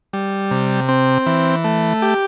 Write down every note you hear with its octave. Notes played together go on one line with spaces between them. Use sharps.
G3
C3
C4
E3
A3
G4